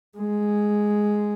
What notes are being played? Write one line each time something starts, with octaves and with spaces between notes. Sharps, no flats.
G#3